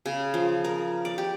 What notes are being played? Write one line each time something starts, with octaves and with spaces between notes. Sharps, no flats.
C#3
F3
A#4
D5
G4